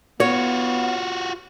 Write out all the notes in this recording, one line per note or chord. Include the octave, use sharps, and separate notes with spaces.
B3 F4 F#4 C#5